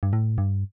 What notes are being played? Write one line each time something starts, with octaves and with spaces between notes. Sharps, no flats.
G2
A2
G2